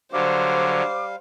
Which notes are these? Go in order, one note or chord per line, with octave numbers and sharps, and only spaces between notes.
D3 F#3 G3 C5 F5 D6